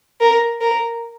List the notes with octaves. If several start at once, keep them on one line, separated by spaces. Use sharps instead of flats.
A#4
A#4